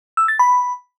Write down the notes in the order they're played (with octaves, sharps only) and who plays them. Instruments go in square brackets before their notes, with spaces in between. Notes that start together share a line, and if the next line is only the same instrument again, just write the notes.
[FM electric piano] E6
A6
B5